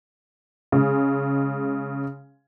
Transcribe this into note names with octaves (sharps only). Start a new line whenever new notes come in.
C#3 G#3